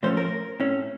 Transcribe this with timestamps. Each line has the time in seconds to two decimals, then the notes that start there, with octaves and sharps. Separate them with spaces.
0.03 A2 F3 A3 C#4 C5
0.17 A#4
0.60 A2 A3 C#4